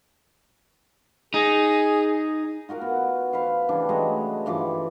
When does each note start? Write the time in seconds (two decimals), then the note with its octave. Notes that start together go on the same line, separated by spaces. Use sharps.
1.34 D#4 G#4
2.69 F4 F#4 A#4 F#5
2.81 B3
3.33 B4 C5 F5 C#6
3.69 C#3 E3 G3 D4
3.89 G#3 A3 F#4 D#5
4.46 G2 E3 F3 D6